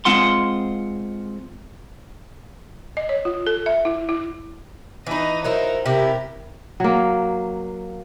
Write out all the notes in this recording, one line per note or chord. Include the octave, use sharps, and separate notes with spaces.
G#3 C4 F4 F#5 C6
D#5
C#5
F4
A4
E5
E4
E4
E3 D#4 B4 D#5
F#3 D#4 E4 A#4 C5
C3 E4 G4 A#4
F#3 A#3